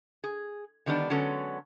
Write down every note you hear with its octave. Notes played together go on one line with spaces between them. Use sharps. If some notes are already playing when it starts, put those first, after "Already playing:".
G#4
D3 D#3 G3 B3 D4
D3 F#3 G#3 B3 C#4 A4